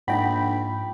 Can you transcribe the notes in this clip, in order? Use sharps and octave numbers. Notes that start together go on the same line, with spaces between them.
A#1 G#2 D#4 E5 F#5 G5 B5